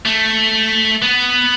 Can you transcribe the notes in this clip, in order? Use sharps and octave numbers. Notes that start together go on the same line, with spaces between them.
A3
B3